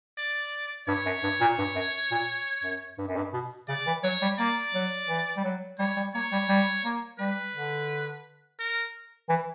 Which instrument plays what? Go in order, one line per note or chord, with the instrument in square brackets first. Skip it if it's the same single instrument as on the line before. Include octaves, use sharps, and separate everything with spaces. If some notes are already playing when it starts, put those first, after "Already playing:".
[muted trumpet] D5
[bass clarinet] G2 [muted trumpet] C#5
[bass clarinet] F#2
G2
A#2
G2
F#2
A#2
F#2
G2
F#2
G2
B2
[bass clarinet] C#3 [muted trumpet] D5
[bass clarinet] E3
[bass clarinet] F#3 [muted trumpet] C#5
[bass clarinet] G3
[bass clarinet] A#3 [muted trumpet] D5
[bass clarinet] F#3
E3
G3
F#3
[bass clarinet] G3 [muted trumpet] C#5
[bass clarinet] G3
[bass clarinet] A#3 [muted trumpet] C#5
[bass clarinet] G3
G3
A#3
[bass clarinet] G3 [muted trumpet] B4
[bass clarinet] D3
[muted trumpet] A#4
[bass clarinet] E3